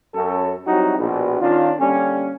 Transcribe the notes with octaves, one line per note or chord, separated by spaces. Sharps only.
F#2 C#4 A4
F#3 G3 C4 D#4 E4 F#4
A#1 B2
D#3 C#4 D4 F4
D3 G3 A#3 C#4